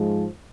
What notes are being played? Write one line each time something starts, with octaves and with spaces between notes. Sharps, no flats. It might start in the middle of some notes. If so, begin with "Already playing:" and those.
Already playing: G#2 F3 G#3